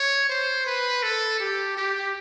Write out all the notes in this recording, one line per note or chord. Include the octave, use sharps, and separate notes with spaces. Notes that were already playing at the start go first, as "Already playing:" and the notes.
Already playing: C#5
C5
B4
A4
G4
G4